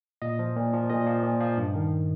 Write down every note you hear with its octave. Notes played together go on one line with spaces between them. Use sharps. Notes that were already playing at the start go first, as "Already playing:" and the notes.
A#2 D#5
F3
A#2
F3
A#2 D#5
F3
A#2
F3
G2
D#3